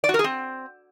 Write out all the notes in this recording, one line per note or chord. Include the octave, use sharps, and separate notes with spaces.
D5
F#4
A#4
G#4
C4